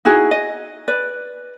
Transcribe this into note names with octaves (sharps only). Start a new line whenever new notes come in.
D#4 E4 F#4 G#4
D#5
B4 D5